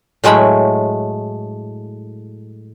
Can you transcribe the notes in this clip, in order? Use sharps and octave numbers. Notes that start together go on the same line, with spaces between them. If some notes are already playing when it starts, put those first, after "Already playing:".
A2 F#3 G#3 A3 B5